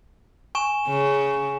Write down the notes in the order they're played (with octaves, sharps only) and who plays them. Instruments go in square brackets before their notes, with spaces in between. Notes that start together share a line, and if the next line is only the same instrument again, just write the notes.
[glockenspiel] G#5 C#6 E7
[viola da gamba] C#3